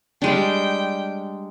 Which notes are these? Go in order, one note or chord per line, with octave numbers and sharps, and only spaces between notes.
G3 G#3 D4 G5